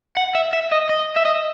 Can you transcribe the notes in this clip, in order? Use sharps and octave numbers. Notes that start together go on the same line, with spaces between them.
F#5
E5
E5
D#5
D#5
E5
D#5